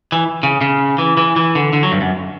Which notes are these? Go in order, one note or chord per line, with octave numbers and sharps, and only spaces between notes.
E3
C#3
C#3
E3
E3
E3
D3
D3
F#3
G2
F#2